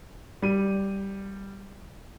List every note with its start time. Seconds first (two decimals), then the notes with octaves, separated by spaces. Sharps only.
0.42 G3 D#7